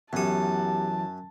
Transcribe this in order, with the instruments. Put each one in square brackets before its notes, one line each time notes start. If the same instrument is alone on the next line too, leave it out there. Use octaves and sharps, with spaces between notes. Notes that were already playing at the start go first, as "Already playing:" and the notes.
[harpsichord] F#2 D#6 [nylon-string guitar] E3 F#3 [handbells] B3 G4 [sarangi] A5